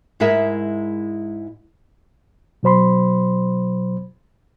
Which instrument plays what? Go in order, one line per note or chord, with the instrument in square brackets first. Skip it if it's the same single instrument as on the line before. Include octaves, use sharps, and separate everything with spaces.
[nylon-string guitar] G#2 G#3 E4 G#4 A#4 E5
[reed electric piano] B2 F#3 C5 B5 C6